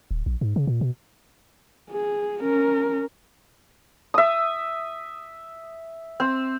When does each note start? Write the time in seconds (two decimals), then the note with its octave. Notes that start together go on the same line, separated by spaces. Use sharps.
0.11 D1
0.26 A#1
0.41 G#2
0.56 C#3
0.67 A#2
0.81 B2
1.90 G#4
2.40 C#4 A#4
4.14 E5 D#6
6.20 C4